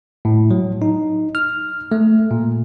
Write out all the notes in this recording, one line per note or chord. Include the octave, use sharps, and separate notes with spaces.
A2
F#3
D#4
F6
A3
A#2